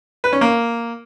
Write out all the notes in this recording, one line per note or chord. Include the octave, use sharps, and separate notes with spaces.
B4
C#4
A#3